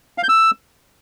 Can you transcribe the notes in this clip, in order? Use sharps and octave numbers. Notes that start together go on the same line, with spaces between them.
F5
G6
E6